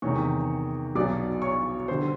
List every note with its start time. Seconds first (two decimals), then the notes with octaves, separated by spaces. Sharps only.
0.02 E2 C3 D#3 G#3 C#5 C#6
0.95 B1 B2 F#3 D5 D6
1.42 C#5 C#6
1.88 D3 G3 C5 C6